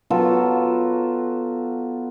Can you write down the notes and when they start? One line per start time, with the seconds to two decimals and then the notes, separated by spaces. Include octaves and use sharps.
0.10 F#3 B3 F4 A4